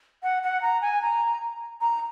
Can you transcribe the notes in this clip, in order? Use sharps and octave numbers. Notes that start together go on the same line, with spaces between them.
F#5
F#5
A#5
G#5
A#5
A#5